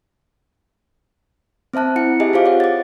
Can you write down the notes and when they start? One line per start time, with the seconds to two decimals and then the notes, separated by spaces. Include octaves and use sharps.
1.74 C4 C5 E5 A5 F#6
1.96 E4 F#5 C#7
2.20 G4 G#4 D#5 E5 G#5
2.33 F4 G#4 C5 F5 D6
2.45 C5 C#5 F#5
2.60 D6 A6